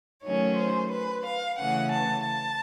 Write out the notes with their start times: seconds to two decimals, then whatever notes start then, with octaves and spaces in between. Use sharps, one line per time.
0.23 D#3 F#3 A3 C#4 C#5
0.56 C5
0.91 B4
1.25 F5
1.58 C#3 E3 A3 C#4 F#5
1.92 A5
2.26 A5